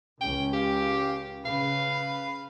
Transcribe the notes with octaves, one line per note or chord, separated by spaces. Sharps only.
C#2 C#4 G5
G4 F5 G5
C#3 B4 F5